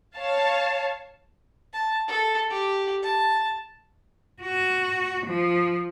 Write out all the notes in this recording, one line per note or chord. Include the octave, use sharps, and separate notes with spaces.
C#5 F5 A5
A5
A4
G4
A5
F#4
F3